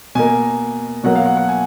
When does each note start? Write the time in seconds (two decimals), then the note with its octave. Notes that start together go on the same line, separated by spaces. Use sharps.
0.15 B2 A#3 G#5
1.04 B2 F#3 A#3 F#5
1.16 F5
1.26 F#5
1.37 F#5
1.49 G#5